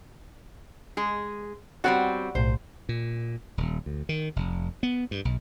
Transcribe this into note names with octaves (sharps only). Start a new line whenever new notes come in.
G#3 G#4
G3 B3 C4 F#4 C#5 F#5
B1 A2 C5
A#2
D#1
D2
D#3
F1
B3
G2
B1